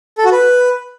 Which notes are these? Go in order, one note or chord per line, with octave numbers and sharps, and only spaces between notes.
A4
F#4
B4